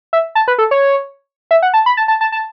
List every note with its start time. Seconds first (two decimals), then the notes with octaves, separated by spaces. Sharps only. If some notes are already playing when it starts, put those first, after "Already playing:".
0.13 E5
0.35 A5
0.48 B4
0.58 A4
0.71 C#5
1.51 E5
1.62 F#5
1.74 A5
1.86 B5
1.97 A5
2.08 A5
2.21 A5
2.32 A5